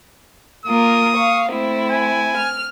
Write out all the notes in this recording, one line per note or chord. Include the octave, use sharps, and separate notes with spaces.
A#3 F4 A#4 D#6
F5 C#6
A3 C4 E4
G#5
F6